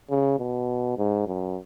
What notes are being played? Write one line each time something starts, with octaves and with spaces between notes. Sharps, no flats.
C#3
B2
G#2
F#2